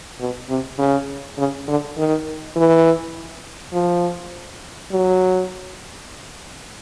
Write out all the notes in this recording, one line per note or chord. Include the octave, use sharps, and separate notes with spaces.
B2
C3
C#3
C#3
D3
D#3
E3
F3
F#3